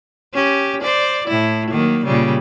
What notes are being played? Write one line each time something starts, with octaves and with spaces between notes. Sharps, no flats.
C#4 G4
C5 D5
A2 E4
D#3 F#3 A#3
A#2 C#3 G3